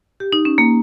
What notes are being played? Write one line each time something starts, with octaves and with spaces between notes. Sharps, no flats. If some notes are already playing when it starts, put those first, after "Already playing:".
G4
D#4
C#4
A#3